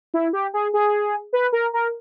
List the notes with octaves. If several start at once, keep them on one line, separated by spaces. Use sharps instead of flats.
E4
G4
G#4
G#4
B4
A#4
A#4